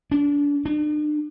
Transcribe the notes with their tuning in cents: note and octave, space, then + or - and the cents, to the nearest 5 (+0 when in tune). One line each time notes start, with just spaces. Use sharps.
D4 -30
D4 +40